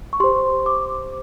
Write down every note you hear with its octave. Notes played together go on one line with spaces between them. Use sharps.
C#6
G4 C5 C6
D6